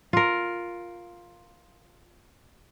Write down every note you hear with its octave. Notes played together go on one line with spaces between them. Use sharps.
F4 A#4